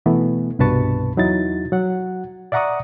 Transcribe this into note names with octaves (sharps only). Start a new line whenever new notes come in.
B2 E3 A3 B3
C2 G2 B2 B4 A5 C#6
E2 F#3 D#4 E4 A6
F#3 F#5
D5 E5 F#5 A#5 C#6 D#6